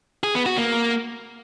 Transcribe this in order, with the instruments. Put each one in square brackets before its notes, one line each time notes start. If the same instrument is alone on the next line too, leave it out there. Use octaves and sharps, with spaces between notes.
[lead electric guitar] G#4
B3
F#4
A#3